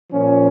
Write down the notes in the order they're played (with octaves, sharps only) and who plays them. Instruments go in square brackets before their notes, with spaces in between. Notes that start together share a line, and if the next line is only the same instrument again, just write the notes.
[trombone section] A#2 F3 C#4